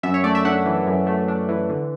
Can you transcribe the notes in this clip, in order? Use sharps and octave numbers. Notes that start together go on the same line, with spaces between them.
F#2 E5
C#5
A3 D5
E5
D4 F#5
E3
F#2
A3
D4
E3
D3